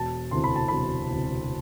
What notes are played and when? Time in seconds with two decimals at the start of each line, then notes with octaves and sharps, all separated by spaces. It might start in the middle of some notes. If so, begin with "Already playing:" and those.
Already playing: E1 A5
0.31 D2 C3 E3 C6
0.44 B5
0.56 A5
0.68 E1 B5
1.09 D2 C3 E3